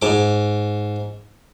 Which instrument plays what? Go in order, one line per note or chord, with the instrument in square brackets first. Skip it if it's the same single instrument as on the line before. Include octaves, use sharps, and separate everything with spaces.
[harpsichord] G#2 D6